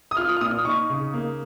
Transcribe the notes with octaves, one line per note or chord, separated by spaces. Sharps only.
D#6
F4 F6
F6
A#2 D#6
D#4 C#6
C#3
A#3